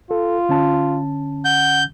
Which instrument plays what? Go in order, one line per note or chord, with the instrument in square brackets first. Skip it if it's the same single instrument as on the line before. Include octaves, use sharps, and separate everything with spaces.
[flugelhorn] F4 [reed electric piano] A4
[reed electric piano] D3 C#4 A5
[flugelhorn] F#5 [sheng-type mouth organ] G6